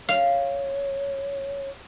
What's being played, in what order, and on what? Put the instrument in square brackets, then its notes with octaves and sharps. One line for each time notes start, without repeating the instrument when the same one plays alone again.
[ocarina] C#5 [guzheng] F5